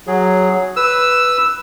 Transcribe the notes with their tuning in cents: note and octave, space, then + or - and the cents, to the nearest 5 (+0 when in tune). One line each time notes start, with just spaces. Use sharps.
F#3 +0 G#4 +0
B4 +0 E6 +0